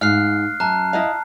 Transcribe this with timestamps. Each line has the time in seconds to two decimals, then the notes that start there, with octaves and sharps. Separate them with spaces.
0.01 G#2 F5 F6 F#6 C7
0.60 F#2 A5 A#5 F#6
0.93 E4 D#5 F5